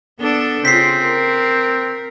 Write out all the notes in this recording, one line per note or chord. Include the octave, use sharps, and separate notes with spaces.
B3 D4 A4
C#3 C4 F4 B6 C7
A#4